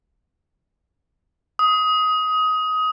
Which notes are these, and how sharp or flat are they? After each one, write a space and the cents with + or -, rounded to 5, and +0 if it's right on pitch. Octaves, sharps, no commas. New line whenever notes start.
D#6 +20